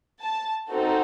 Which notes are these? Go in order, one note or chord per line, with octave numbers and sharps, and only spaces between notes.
A5
C4 D#4 F#4 A4